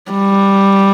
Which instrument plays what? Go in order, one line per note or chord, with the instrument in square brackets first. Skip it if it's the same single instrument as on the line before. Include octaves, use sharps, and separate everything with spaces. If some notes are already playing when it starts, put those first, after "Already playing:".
[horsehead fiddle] G3